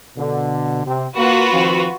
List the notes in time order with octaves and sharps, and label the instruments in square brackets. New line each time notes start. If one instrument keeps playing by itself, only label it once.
[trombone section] B2 D3
C3 C4
[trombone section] A#3 [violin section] F4 F#4 B4
[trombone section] D#3 F3 C4